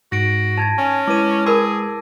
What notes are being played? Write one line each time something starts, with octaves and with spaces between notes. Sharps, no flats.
G#2 F#4 A#6 D7
D#4 A5 G#6 A6
C#4 G#5 A5
G#3 E4 B4 D6 D#7
G#4 A#4 B5 E6